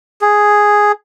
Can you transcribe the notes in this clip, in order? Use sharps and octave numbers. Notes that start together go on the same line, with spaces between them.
G#4